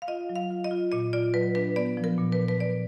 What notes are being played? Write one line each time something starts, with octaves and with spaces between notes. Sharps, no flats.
F5
F4 D#5
F#3
F5
F4
D#5
F4
A#2 D#5
F4 D5
F#3 B4
D4 B4
B3 D5
F3
A#4
A#2
B4
A#2
B4
A#2 D5